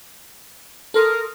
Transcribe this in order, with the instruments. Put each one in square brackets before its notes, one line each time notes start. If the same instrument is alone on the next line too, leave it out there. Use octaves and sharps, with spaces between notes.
[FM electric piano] A4 C6 D#6 [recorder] A#4